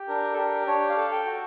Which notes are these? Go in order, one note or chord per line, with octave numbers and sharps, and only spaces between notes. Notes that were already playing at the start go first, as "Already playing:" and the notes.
Already playing: G4
D4 A#4
A4
G4 A#4
D4 C#5
F5
A4
G5
F#4